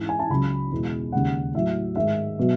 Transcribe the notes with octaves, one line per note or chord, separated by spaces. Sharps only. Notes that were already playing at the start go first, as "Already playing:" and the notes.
Already playing: G#2 E3 G#3
G#5
A5
C#2 C#3 F#3 B5
E2 B2 G#3
D#2 C#3 G#3 F#5
A2 F#3 E5
G#2 D#3 G#3 E5
B2 F#3